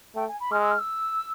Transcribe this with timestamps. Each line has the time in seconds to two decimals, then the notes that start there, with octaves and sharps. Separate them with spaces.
0.15 A3 G5
0.28 G#5
0.40 B5
0.51 G#3 F6
0.61 E6
0.70 F6
0.78 E6